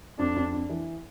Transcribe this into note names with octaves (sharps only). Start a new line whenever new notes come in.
F2 D4
F2
D4
E3